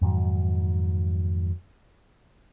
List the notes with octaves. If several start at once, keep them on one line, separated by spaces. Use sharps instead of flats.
F2 G#2 D#3 F#3